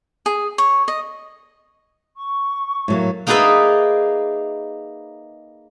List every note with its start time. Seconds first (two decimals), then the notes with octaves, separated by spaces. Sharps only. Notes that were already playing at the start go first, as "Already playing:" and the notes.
0.26 G#4
0.58 C#5
0.88 D#5
2.16 C#6
2.88 A2 F#3 A#3
3.27 A#3 D#4 G#4 B4 D5 E5